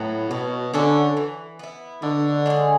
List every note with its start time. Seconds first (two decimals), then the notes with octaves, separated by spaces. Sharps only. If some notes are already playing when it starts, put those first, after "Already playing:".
Already playing: A2 F#3 B3
0.30 B2 F#3
0.73 D3 C#4 F#4 A4
1.17 E3
1.59 B3 E4
2.02 B2 D3
2.46 G#3 C#4 G#4